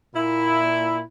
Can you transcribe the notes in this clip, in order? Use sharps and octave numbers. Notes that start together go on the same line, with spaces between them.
A#2 E4